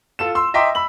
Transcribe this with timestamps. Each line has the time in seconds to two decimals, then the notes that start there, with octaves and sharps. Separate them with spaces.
0.19 F4 A4 E7
0.35 C6 E6
0.54 D#5 E5 G5 A#5 C6 D6
0.75 B5 E6 F#7